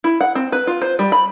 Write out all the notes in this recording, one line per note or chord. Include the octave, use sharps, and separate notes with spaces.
E4
F#5
C4
B4
F4
C5
G3
B5